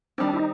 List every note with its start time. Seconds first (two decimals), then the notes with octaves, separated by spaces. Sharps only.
0.18 D#3 G3 C4 D4
0.33 E4
0.38 D#4